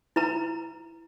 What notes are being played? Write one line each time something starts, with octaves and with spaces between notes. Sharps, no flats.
E4 B4 A#5